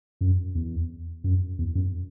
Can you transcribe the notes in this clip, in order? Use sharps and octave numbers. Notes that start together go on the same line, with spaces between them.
F#2
E2
F#2
E2
F#2